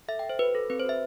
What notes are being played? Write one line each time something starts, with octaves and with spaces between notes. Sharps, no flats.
A4 E5
G5
A4
C5
F#4 B4
A4
C4 B4
C5
F#4 E5